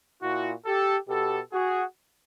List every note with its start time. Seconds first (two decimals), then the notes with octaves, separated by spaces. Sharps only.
0.22 A#2 E4 F#4
0.65 G4 A4
1.09 B2 G4 A4
1.53 F#4 G#4